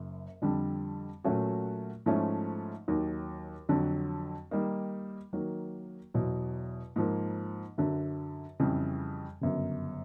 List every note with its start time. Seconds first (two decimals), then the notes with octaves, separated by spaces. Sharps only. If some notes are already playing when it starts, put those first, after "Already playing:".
Already playing: F#1 F#2
0.42 F2 D3 G3
1.24 A#2 F#3 A3 C#4 F#4
2.06 G#2 F3 A3 C#4 E4
2.88 D#2 D#3 F#3
3.69 F2 D3 F#3
4.51 D#3 G3 A#3 D#4
5.33 D#3 F#3 A#3
6.14 E2 B2 F#3
6.96 G#2 F3 A#3
7.78 F#2 D3 F#3
8.60 F2 C#3 E3 G3
9.41 G1 F#2 C#3